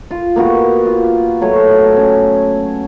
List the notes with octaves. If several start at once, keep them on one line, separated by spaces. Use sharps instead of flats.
F4
A#3 B3 F#4 G4
F4
F#3 A3 C#5
C#4